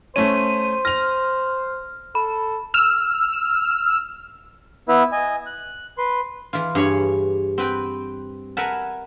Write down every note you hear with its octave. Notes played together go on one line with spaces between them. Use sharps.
A3 C#4 C5 D#7
F6 A#6 F7
A4 B5
E6 F6
B3 E4 B4 E5
D#5 G#5
F#6
B4 C6
E3 F4
G2 G#4 C#5 B5
C4 B4 G5
A#4 B4 E5 F#5 G#5 A5